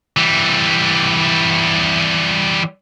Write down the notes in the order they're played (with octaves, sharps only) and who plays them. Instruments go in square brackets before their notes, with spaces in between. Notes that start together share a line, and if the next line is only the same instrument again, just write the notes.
[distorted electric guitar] E3 G3